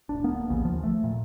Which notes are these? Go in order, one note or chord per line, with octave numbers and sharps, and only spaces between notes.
D1 G#1 D4
A#3 B3
A#1 D#2 C#3 E3
F3
A3
A#2